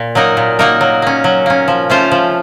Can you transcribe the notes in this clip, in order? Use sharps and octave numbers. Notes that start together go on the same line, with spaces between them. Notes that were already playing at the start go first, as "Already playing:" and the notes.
Already playing: A#2
F#3 A#3 D#4 A#4
A#2
F#3 A#3 D#4 A#4
F#3
A#3 C#4
F#3
A#3 C#4
F3
A3 C#4 F4 C5
F3